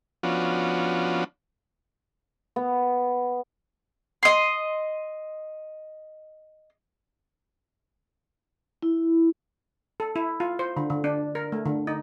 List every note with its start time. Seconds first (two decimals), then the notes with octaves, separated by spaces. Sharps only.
0.23 F3 B3 C#4 D4 F4 F#4
2.56 B3
4.23 D#5 C6
8.82 E4
10.00 A4
10.16 E4
10.40 F4
10.59 C5
10.77 D3
10.90 D3
11.04 D4
11.35 A#4
11.52 A3
11.66 D3
11.87 D#4